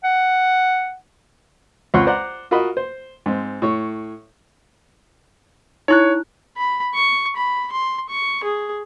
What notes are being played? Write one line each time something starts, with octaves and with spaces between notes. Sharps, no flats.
F#5
C#2 C4 F4 C#5 F#5 C6
C5 D5 F#5 A#5
F4 F#4 A#4 D#5 B5
C5
G#2 C4
A2 C#5
D#4 E4 C#5 C#6 F#6
B5
C#6
B5
C6
C#6
G#4